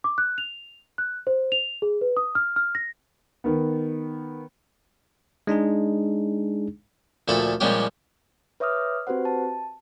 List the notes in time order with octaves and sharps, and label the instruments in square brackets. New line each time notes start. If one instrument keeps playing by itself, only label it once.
[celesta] D6
F#6
F7
F#6
C5
F7
G#4
B4
D#6
F6
F6
A#6
[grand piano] D#3 B3
[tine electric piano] G#3 D4 D#4 G#4
[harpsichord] D2 A#2 F3 A4 B5 C#6
A#2 F3 G3 G#3 C#4 G4
[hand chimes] B4 C#5 E5 D6 D#6 F6
C4 F#4 G4 B4 C5 F#5
A5